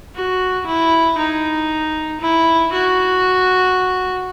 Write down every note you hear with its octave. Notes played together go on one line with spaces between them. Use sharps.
F#4
E4
D#4
E4
F#4